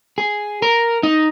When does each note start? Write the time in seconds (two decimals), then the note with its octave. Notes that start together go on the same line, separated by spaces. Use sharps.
0.18 G#4
0.62 A#4
1.03 D#4